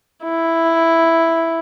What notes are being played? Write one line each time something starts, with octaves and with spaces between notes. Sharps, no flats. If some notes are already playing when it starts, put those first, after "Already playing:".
E4